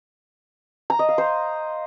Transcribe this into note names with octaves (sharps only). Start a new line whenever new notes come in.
A#5
D#5
F5
C5